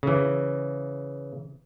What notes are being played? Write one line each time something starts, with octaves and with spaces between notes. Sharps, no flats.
C#3 E3